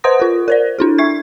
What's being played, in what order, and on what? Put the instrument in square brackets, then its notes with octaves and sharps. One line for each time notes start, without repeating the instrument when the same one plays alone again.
[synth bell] B4 C5 F#5 C6 D#6 A#6
F4 A#4
A#4 C5 D5
D4 E4 A4
E5 C#6 G#6